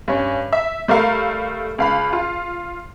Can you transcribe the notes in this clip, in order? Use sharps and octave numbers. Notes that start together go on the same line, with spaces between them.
G2 C#4
E5
G3 A3 A#4 F5 B5
C#2 F5 B5
F4